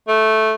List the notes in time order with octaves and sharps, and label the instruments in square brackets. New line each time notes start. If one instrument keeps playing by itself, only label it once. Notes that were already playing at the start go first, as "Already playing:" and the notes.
[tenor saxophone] A3